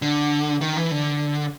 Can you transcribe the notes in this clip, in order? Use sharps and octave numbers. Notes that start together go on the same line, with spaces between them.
D3
D#3
E3
D3